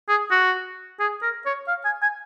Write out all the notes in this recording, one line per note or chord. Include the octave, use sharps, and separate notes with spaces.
G#4
F#4
G#4
A#4
C#5
F5
G#5
G#5